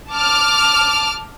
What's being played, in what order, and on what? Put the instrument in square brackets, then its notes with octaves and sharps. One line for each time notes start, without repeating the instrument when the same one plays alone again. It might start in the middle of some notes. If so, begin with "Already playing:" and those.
[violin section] A5 D6 F6